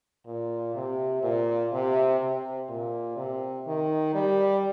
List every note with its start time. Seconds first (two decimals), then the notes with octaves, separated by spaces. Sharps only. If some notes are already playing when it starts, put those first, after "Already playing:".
0.26 A#2
0.75 C3
1.23 A#2
1.72 C3
2.20 C3
2.69 A#2
3.17 C3
3.66 D#3
4.14 G3